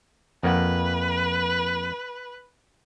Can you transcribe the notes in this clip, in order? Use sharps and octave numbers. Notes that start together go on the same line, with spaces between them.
F2 A#3 B4 F#5